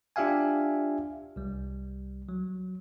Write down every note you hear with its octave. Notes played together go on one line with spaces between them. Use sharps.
D4 F4 G4 E5 F5 G#5
C2 G3
F#3